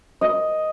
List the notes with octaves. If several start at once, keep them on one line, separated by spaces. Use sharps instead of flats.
D#5